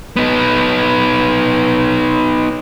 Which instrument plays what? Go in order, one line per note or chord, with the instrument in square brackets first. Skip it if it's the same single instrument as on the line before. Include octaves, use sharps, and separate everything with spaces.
[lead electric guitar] B3 D#4